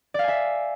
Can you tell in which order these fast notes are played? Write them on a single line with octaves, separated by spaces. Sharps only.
D5 F5 G#5 E5